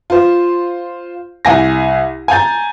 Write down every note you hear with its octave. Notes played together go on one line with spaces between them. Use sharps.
F4 C5
C2 G#5 A#6
G#5 A#5 G6 A6